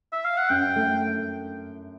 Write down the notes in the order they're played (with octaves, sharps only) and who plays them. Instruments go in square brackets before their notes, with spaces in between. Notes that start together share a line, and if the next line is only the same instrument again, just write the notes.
[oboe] E5
F5
F#5
[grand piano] F#2 [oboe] G5
[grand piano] A3